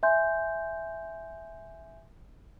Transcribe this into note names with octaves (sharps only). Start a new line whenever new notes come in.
E5 G#5 C6 G6